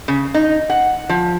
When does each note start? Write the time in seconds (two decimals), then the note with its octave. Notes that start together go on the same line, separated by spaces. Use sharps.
0.08 C#3
0.34 D#4
0.70 F#5
1.09 F3